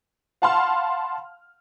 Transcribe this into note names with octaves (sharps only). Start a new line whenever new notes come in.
F5 F#5 A5 B5 C6 F6